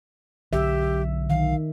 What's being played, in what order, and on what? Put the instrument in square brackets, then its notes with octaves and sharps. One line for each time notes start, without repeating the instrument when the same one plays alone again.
[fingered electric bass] B1 D3 F#3 [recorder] G4 [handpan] E5
[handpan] D#3 [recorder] F5